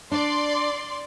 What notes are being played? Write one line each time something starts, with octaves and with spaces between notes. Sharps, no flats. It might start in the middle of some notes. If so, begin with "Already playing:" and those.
D4 D5 C6